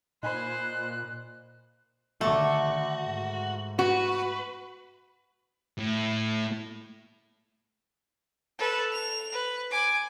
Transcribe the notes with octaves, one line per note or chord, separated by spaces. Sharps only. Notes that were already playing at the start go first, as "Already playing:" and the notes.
A#2 D#4 C5 G#5 B5 F#6
D3 D#3 A3 F#4
G#2
F#4 B4
A2
A4 B4
F7
B4
G#5 D6